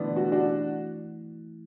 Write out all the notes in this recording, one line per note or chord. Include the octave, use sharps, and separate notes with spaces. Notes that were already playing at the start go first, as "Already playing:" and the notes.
Already playing: B2 D3 E3 A3 B3 D4 E4
F#4
D4 F#4